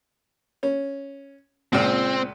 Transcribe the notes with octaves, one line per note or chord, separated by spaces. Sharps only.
C#4
C#2 A#2 C4